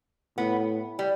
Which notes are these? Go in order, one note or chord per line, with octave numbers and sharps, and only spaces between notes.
A2 B3
G3